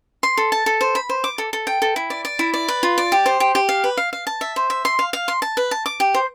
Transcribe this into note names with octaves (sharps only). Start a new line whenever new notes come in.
C6
A4
A5
A4
C5
B5
C5
D6
A4
A4
G5
A4
E4
D5
D5
E4
D5
B4
F4
D5
G4
C5
G4
G4
F5
B4
F5
F5
A5
E5
C5
E5
C6
F5
F5
C6
A5
B4
A5
D6
G4
C5